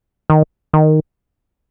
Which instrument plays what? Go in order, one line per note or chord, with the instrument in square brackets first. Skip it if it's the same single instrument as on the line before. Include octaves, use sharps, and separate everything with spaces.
[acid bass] D#3
D#3